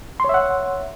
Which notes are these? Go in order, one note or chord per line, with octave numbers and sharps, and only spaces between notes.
C#5 E5 F#5 C6